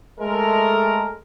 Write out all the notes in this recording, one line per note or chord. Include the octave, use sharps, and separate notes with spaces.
G#3 A3 A4 A#4